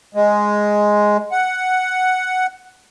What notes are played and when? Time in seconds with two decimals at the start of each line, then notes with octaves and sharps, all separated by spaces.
0.15 G#3
1.32 F#5